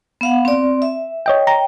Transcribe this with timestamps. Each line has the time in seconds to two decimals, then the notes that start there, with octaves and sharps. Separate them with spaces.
0.21 B3 F5 F#5
0.45 C4 D5
0.82 E5
1.26 C#5 D#5 G5
1.47 G5 A#5